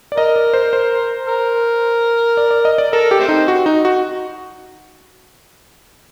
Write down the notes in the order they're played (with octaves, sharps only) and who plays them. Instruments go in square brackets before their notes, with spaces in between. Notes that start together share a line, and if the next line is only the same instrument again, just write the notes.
[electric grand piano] D5
[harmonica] A#4 [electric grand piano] D#5
[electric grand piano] D5
C5
C5
[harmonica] A#4
[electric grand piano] D5
D5
D#5
D5
[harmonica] A4 [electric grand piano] A#4
[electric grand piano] G4
[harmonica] A3 C4
[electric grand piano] D#4
F#4
D#4
F#4